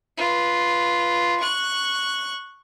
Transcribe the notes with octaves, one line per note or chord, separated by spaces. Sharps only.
F4 B4
C#6 F#6